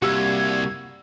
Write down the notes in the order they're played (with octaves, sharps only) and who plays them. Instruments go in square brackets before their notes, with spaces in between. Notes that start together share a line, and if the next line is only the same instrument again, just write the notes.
[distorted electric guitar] C2 [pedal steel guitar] G3 A#3 F#4 [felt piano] G4 E6 [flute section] G#6